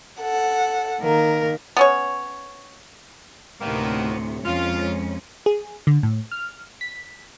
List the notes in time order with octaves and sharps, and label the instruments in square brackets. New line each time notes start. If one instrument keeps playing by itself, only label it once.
[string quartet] A4 F#5
D#3 A#3 A#4
[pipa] B3 C#4 C#5
[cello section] D2 A2 C3 [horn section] D#3 A#3 B3
[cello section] F2 G#3 C#4 [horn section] F4
[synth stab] G#4
D3
A2
F6
B6